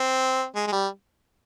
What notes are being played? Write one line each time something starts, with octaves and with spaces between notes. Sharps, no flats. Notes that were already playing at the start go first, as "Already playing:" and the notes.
Already playing: C4
G#3
G#3
G3